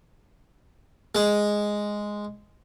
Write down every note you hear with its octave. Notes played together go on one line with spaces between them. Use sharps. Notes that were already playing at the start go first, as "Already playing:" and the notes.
G#3